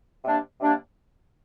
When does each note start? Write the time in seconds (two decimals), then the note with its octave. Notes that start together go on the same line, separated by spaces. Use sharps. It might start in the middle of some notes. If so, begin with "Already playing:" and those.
0.24 C3 G3 A#3 D4
0.60 C3 G3 A#3 D4